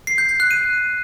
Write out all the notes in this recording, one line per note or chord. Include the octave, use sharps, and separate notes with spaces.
C7
G6
G6
F#6
D#7